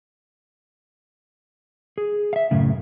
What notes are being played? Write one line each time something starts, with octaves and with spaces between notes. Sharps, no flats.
G#4
E5 F5
C#2 F#2 A2 C#3